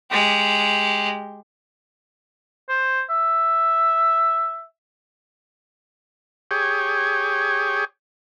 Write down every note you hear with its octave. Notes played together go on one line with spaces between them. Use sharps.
G#3 G4
C5
E5
G4 G#4 C#5